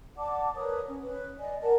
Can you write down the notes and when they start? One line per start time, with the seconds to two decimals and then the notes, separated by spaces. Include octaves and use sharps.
0.17 D5 F#5 A5 D6
0.55 A#4 B4 C#5 D#6
0.86 C#4
1.04 B4 C#5
1.38 D5 D#5 G#5
1.62 A#4 D5 F#5 A5